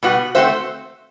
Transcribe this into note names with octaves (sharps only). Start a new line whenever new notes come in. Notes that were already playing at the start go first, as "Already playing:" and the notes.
B2 G3 B3 F#4
A3 C4 F#4 C5 E5